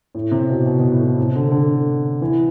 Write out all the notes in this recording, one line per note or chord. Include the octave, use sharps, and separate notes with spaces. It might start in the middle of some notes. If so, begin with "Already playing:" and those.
A2
C3
B2
B2
B2
A2
A2
C3
D3
D3
E3